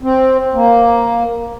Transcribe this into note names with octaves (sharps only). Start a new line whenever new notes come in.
C4
A#3